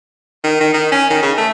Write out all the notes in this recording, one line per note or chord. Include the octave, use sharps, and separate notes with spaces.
D#3
D#3
D#3
C#4
D#3
C#3
A3